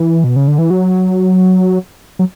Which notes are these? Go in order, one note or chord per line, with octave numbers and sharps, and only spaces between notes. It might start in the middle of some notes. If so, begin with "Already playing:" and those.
Already playing: E3
B2
C#3
D3
E3
F#3
F#3